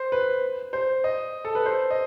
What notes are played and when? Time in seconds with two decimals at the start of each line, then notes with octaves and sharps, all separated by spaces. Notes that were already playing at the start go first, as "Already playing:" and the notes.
Already playing: C5
0.12 B4
0.73 C5
1.04 D#5
1.45 A4
1.55 B4
1.66 C5
1.91 D#5